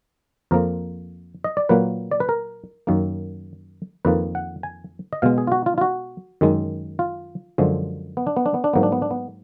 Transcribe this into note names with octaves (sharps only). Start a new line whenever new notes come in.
F2 F3 A#3 A#4
D#5
D5
A#2 F#3 A#3 B4
D5
B4
A#4
F#2 D#3 A#3
F2 D#3 A#3 B4
F#5
G#5
D#5
B2 G#3 F5
G#4
F4
F#4
F4
F4
F#4
F#2 D#3 G#3
F4
F#2 D3 F3 G#3
B3
D4
B3
D4
B3
D4
G#2 F#3 A#3 B3
D4
B3
D4
B3